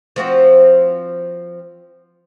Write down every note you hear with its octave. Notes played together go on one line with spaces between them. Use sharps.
F3 C4 F#4